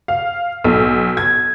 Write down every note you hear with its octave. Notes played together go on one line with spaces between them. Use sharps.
F5
B1
G#6